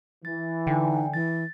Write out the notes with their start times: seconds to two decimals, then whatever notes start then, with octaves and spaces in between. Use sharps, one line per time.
0.25 E3 A6
0.67 D3 D#4 G5 G#5
1.14 E3 A6